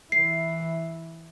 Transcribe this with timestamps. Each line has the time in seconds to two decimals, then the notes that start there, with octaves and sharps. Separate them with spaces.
0.12 E3 E4 C7